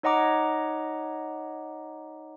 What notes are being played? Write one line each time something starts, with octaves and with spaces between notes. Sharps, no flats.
D#4 C#5 D#5 F#5 A#5 D6